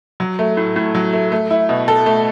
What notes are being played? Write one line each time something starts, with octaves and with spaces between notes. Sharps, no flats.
F#3
A3
A2
A2
F#3
A3
A3
E4
B2
A4
A3